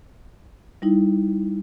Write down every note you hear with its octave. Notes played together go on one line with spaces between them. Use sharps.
G3 D#4 E4